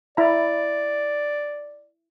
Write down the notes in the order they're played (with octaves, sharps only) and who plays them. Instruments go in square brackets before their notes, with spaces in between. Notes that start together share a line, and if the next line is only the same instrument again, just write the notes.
[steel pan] E4 A#5 [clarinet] D5